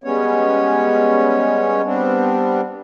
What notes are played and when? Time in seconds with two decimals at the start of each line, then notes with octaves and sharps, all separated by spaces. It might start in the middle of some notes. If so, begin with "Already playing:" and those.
0.04 G3 G#3 B3 C#4 C#5
1.85 G3 B3 C4 D4